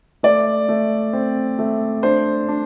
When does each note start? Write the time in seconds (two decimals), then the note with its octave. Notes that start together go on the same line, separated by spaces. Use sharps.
0.23 A3 D5
0.69 A3
1.13 C4
1.59 A3
2.03 D4 C5
2.48 D4